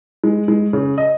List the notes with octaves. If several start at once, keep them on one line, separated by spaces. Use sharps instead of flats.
G#3
G#3
C#3
D#5